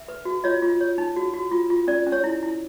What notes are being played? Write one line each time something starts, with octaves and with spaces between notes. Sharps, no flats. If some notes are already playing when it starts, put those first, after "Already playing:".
Already playing: E5
B4
F#4
F4 C#5 D#5
F4
C#5
D#4
F#4
F#4
F4
F4
C#4 D5
C#4
C#5
E4
E4